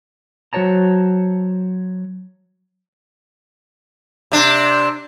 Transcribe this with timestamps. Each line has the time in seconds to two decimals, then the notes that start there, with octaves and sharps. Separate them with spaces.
0.53 F#3 F#4 C5 C#5 A5 A#5
4.32 C3 D4